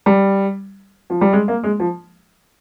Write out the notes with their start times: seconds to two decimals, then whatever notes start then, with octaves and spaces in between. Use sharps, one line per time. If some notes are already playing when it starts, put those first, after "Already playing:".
0.06 G3
1.10 F3
1.21 G3
1.33 G#3
1.48 A#3
1.63 G#3
1.80 F3